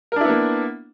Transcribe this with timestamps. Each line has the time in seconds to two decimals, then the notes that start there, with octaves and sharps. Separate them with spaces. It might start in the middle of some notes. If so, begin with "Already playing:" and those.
0.12 A#4
0.16 D4
0.21 E4
0.25 B3
0.29 A#3